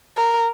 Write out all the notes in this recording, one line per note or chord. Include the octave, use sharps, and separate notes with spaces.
A#4